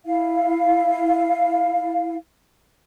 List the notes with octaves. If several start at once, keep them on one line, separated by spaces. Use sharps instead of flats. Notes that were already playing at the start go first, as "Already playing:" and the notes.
E4 F5